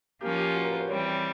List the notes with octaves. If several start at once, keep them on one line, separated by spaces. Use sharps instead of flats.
F3 A#3 C#4 F4 G4
G4
F#4
A#4
B4
C5
E3 G3 C4 C#5
C5
C#5